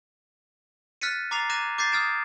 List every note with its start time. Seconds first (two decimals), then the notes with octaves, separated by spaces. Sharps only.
1.01 F6 F#6 A6 B6 C#7 D#7
1.31 A#5 D6 A6 C7 F7
1.50 D6 F#6 G#6 A#6 D#7 E7
1.78 D6 G6 A6 A#6 C7
1.92 D#6 F6 G#6 A6 D7 E7